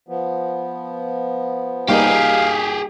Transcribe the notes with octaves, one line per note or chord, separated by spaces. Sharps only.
F3 B3
G3 A#3 D#4 G4 G#4 F5